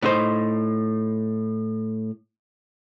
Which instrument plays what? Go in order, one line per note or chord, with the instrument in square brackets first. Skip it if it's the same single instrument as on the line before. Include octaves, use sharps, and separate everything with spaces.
[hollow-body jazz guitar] A2 D#4 C5